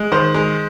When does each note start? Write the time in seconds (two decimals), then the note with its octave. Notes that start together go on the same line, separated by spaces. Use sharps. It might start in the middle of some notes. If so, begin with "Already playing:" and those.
Already playing: G#3
0.12 D#3 C5
0.34 G#3